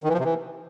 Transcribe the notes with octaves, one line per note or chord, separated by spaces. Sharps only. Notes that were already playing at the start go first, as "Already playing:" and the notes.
D#3
E3
F3
C3
E3